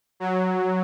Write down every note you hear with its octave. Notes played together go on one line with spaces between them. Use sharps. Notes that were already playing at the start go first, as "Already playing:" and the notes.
F#3